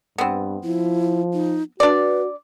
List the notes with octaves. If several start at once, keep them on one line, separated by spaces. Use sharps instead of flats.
G2 B3 C4
F3 E4
D#4
D4 F#4 B4 D5